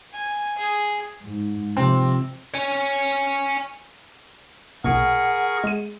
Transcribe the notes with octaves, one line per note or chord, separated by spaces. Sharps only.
G#5
G#4
G#2
C3 F3 C4
C#5 G#5
B1 A#2 G#4 A#4 F#5 C#6
G#3 D#7